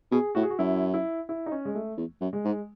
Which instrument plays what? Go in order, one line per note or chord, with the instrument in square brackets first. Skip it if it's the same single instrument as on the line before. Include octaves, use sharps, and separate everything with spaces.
[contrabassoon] B2 [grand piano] G#4
[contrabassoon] A2 [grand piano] F#4
[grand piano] G#4
F#4
[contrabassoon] F#2 [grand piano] E4
[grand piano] E4
E4
D#4
C#4
G#3
A3
[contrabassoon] E2
F#2
[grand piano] G#3
[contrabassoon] G#2